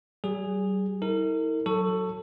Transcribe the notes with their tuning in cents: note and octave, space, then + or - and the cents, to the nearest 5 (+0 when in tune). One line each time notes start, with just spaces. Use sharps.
G3 -40 G#4 -10
E4 -45 A#4 -35
F#3 +0 A4 +15 C#6 +0